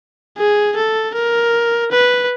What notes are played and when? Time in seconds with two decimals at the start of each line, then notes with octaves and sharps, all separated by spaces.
0.38 G#4
0.76 A4
1.15 A#4
1.91 B4